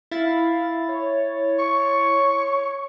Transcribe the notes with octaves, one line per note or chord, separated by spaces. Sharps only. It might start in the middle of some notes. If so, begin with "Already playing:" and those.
E4 F5 A6
C#5
C#6